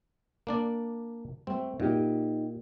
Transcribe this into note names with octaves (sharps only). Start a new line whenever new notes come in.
A#3 D4 D5
A3 C4
A#2 D#4 G4